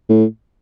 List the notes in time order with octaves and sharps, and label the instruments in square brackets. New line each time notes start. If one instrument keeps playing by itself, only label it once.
[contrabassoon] A2